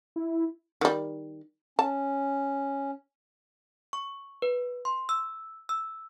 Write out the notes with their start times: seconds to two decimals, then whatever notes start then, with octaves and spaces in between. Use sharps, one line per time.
0.16 E4
0.81 D#3 G3
1.79 C#4 A5
3.93 C#6
4.42 B4
4.85 C6
5.09 E6
5.69 E6